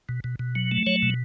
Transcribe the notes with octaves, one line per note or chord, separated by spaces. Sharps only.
B2
B2
B2
F#3
A3
F#3 C#5
B2